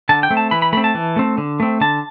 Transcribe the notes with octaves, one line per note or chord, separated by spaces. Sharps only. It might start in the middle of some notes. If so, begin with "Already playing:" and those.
D3 A5
G5
A3 C4
A5
E3 B5
B5
A3 C4 B5
A5
E3
A3 C4
D3
A3 C4
D3 A5